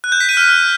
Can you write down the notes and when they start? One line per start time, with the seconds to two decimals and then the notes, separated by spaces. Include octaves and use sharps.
0.04 F#6
0.12 G6
0.20 B6
0.29 D#7
0.37 F6